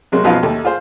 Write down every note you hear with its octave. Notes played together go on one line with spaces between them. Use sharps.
C3 F#3 G#3 A#3
B1 F#2 F3 D#4 F4 B4
D#2 A3
F4 G#4 C5